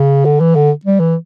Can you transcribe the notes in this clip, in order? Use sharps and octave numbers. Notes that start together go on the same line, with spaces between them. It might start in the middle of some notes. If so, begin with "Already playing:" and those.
Already playing: C#3
D3
E3
D3
G3
E3